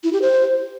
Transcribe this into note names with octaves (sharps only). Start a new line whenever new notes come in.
E4
G4
C5